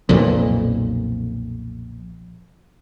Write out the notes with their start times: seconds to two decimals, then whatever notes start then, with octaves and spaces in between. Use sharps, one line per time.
0.09 B1 F2 A#2